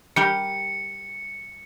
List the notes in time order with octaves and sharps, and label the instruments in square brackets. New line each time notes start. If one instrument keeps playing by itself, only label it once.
[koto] G3 G4 A#4 [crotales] C#7